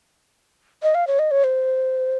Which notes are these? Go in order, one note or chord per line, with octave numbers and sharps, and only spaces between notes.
D#5
F5
C#5
D#5
C#5
C5